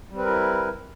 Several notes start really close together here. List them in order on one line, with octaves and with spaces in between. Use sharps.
G3 C4 B4 A#4 E4